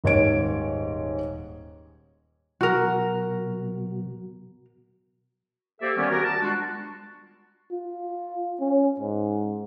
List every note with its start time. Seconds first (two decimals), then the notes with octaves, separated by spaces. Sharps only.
0.04 D#1 G#2 C#5 G#6 D7
2.61 B2 F#3 F#4 A#4
5.81 A#3 G4 A4 C5 D5 E5
5.97 D#3 G3 B3 C#4
6.10 B3 F#4 G4 A#4
6.23 A5
6.42 G3 G#3 D4 F4 F#4
7.72 F4
8.60 C#4
9.00 G#2